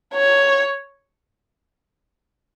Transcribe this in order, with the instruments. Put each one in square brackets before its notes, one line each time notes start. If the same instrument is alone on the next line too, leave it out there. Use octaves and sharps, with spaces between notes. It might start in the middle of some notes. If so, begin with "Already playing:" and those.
[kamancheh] C#5